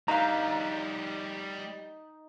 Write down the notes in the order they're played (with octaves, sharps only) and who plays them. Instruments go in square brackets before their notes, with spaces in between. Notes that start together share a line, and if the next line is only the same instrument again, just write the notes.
[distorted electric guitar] G3 F#4 [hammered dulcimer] D#4 [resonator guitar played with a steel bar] B4 F5 [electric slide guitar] A#5